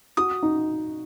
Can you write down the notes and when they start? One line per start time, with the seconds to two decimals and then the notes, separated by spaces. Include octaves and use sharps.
0.17 F#4 D#6
0.43 D#4